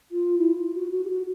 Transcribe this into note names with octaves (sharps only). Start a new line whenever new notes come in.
F4
E4
F4
F#4
F#4
G4
F#4